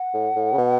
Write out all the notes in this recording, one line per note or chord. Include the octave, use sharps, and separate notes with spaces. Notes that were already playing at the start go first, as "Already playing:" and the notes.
Already playing: F#5
A2
A2
C#3
B2